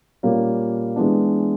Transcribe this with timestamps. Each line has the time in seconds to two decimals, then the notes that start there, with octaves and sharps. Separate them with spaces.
0.23 A#2 G3 A#3 C#4
0.96 E3 G#3 B3 D4